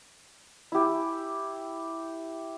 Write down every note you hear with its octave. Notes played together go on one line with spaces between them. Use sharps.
E4 G4